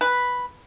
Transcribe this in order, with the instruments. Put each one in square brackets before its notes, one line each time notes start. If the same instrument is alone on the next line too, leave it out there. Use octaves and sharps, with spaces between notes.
[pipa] B4